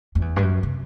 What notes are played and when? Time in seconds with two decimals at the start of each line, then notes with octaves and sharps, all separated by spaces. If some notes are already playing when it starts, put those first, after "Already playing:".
0.15 F2
0.22 E2
0.36 G2
0.43 F#2
0.63 C3